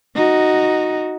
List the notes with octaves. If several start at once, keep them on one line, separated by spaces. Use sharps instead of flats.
D#4 F#4